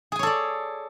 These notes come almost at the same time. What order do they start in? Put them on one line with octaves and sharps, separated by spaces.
G#4 G#5 C#5 A4 D5